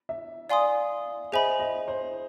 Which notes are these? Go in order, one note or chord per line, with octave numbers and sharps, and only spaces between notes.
E5
D5 F5 G#5 C6 D#6
G#4 C5 D#5 E5 G#5 B5
D#5
C5